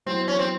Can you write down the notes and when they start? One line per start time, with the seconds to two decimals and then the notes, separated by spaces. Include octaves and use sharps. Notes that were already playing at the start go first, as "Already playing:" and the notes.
0.06 F#3 B3 C4 E4
0.28 C#4
0.39 C4